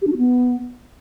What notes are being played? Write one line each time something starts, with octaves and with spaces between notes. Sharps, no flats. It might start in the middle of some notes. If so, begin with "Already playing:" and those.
G4
D4
F#4
B3